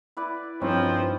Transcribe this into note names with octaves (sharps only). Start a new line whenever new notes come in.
E4 B4 D5
G2 F3 C4 C#4 D#4 C5